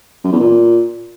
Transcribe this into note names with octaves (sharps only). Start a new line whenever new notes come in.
F#2
E2
A#2